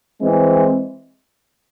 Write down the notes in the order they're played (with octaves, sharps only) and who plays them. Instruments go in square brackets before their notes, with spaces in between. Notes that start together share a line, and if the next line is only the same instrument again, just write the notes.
[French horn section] E3 G#3 C4